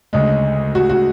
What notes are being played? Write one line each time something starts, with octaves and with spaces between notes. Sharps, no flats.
D2 C#3 G#3
F#4
F#4